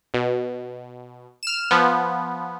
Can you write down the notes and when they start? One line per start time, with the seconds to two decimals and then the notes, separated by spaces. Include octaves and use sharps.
0.14 B2
1.43 F6 E7
1.71 F3 B3